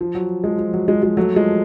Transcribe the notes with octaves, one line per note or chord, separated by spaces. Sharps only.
F3
F#3
F3 G#3
F3
F#3
F3 G#3
F3 G#3
F#3 A3
F3 G#3